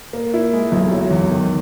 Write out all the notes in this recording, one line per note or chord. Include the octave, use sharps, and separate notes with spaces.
A#3
E4
G#3
B1
F#3
E2
D#3